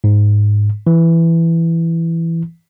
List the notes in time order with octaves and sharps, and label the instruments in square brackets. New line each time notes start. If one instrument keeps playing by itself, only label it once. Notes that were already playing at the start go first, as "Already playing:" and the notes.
[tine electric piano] G#2
E3